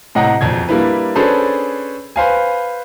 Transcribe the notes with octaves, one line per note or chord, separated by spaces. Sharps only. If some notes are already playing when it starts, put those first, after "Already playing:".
A2 C3 D#5 F#5 A#5
E1 A#1 F2 G#6
G3 A#3 D4 E4 B4
C#4 D4 G#4 A4 B4 C5
B4 C5 F5 G#5